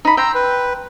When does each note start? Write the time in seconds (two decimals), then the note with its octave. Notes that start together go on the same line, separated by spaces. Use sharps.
0.05 D#4 B5
0.17 G5 A#5 C6 E6
0.35 B4